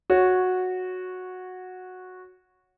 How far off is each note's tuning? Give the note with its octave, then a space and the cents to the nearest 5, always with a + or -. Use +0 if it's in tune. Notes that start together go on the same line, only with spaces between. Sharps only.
F#4 -10 C#5 +0